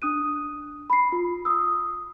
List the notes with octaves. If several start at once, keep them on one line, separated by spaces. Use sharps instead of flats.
D4 D#6 F#6 D#7
B5 C7
F4
D#6 E6